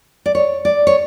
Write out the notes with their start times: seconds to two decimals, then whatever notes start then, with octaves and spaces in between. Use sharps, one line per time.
0.26 D5
0.35 C#5
0.65 D5
0.87 C#5